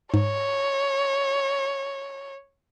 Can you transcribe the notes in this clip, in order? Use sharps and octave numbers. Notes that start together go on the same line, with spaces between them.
G#2 C#5